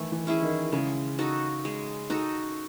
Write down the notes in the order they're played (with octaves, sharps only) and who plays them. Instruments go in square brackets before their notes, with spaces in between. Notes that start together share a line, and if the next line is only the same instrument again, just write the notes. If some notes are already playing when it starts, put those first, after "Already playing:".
Already playing: [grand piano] D#3 E3 [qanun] A3 E4
[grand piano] E3
[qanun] C#4 E4 G#4
[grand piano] D#3
[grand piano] C#3 [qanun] G#3
[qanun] D#4 F#4 A4
G#3
D#4 F#4 A4